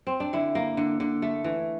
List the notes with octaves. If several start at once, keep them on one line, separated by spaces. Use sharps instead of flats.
C4
D4
D3 E4
A#3
D3
D3
A3
E3